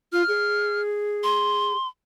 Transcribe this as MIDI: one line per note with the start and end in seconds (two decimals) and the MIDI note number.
0.13 0.23 65
0.13 0.82 89
0.28 1.73 68
1.24 1.88 84